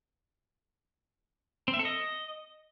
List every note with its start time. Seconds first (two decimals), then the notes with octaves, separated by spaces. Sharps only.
1.68 C4
1.74 E5
1.79 A4
1.85 D#5